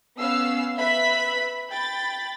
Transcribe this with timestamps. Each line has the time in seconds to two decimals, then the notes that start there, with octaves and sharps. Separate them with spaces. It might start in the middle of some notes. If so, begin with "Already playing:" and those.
0.18 B3 C#4 F5 E6 C7
0.76 B4 E5 B5 B6
1.70 G5 B5 A6